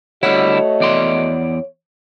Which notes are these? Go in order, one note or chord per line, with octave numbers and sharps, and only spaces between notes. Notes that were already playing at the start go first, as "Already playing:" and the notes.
D3 G3 A3 E4 F#4 C#5 D#5 F#5
E2 D5 C6